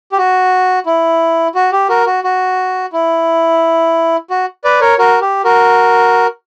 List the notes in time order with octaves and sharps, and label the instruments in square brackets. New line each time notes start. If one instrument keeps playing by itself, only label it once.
[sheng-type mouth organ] G4
F#4
E4
F#4
G4
F#4 A#4
F#4
F#4
E4
F#4
B4 D5
A#4 C#5
F#4 A#4
G4
F#4 A#4